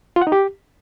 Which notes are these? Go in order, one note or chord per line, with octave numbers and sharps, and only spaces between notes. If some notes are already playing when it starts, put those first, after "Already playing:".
F4
F#5
D#4
G4